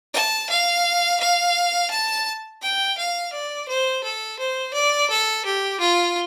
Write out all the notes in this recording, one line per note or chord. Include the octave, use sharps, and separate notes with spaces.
A5
F5
F5
A5
G5
F5
D5
C5
A4
C5
D5
A4
G4
F4